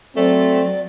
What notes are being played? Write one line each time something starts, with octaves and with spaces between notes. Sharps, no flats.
F#3 A3 C4 D5